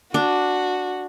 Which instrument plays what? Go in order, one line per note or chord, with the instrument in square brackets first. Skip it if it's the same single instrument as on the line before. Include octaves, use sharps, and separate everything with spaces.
[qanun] D4 [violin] F#4